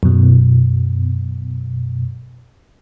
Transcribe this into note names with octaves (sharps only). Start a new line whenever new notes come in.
F#2 B2